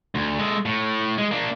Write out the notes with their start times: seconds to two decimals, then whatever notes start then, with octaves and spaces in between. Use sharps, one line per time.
0.15 D2
0.39 G#3 A4
0.66 A2
1.18 G#3
1.31 A#3 D4